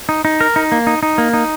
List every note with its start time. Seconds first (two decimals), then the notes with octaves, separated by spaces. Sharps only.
0.09 D#4
0.25 D#4
0.41 A#4
0.56 D#4
0.72 A#3
0.87 D#4
1.03 D#4
1.18 A#3
1.34 D#4